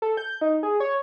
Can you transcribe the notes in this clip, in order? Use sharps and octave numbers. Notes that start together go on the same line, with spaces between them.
A4
G6
D#4
G#4
C#5